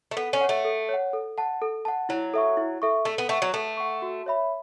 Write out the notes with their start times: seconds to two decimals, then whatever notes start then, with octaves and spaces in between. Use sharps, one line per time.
0.11 A3
0.17 B3 A4
0.33 C#4
0.41 C#5 F#5
0.49 A3
0.65 A4
0.89 C#5 F#5
1.13 A4
1.38 F#5 A5
1.62 A4
1.85 F#5 A5
2.09 F#3 E4
2.34 A4 E5 C#6
2.57 E4
2.82 A4 E5 C#6
3.05 A3 A4
3.18 B3
3.29 A3 F#5 C#6
3.42 F#3
3.54 A3 A4
3.77 F#5 C#6
4.02 F#4
4.26 C#5 E5 B5